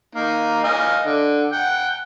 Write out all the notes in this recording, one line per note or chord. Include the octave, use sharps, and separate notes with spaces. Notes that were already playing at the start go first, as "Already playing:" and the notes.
A#3 D#4
D#5 F5 G#5
D3
F#5 G5